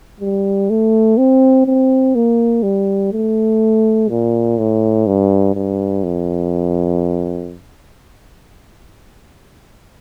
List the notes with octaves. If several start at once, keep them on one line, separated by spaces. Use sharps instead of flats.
G3
A3
C4
C4
A#3
G3
A3
A#2
A2
G2
G2
F2